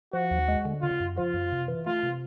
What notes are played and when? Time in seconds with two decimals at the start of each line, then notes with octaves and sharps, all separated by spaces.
0.13 F3 F#4
0.31 D#2
0.48 G#3
0.65 D3
0.82 C#3 F4
1.00 F#2
1.17 F3 F4
1.34 F#2
1.52 C3
1.68 E3
1.86 A3 F4
2.03 C3